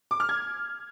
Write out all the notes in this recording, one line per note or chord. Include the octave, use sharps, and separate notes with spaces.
D6
F6
G#6